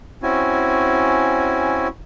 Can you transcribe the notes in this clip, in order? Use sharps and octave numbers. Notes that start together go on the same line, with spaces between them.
C4 C#4 E4 F#4 G#5